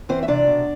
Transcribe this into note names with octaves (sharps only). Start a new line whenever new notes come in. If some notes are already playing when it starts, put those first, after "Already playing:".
E3 C4 C5
E5
C3 D4 D5
B2